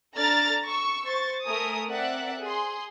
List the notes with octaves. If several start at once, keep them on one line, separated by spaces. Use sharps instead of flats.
D4 A4 D5 A#5 F6 A6
C#6 E6
C5 C#6 A6
A3 A#4 G#5 D#6
C4 A#4 D5 E5 F#5 F#6
G#4 C6